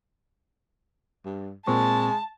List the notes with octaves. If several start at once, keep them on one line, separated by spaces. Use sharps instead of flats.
G2
A#2 G#3 C4 A5 C#6